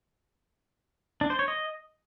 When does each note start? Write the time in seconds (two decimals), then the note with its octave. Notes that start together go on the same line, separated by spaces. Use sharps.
1.21 D4
1.30 C5
1.39 C#5
1.48 D#5